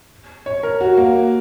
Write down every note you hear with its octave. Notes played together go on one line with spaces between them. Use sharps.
C#5
A#4
F#4
A#3